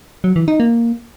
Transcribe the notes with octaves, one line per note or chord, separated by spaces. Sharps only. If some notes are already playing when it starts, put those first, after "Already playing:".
F#3
E3
D#4
A#3